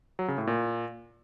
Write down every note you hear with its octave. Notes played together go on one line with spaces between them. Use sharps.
F#3
C#3
A2
A#2